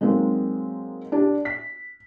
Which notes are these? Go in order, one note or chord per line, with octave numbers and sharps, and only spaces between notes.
F#3 G#3 A#3 C4 D#4
D4 G4
B6